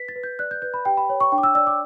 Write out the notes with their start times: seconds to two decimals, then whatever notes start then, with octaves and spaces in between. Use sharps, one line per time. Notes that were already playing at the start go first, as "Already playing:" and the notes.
Already playing: B4 B6
0.08 A6
0.16 B4
0.24 G6
0.39 D5 F#6
0.51 G6
0.62 B4 G6
0.74 B5
0.85 G4 G5
0.97 B5
1.09 C#5
1.20 C#6
1.32 D4 G5
1.38 D6
1.43 E6
1.55 D5 E6
1.67 D6